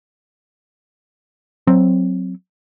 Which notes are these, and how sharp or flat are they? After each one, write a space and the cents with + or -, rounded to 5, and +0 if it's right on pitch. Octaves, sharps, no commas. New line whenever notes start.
F#3 +0 C4 +0